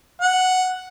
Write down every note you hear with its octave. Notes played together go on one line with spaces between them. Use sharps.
F#5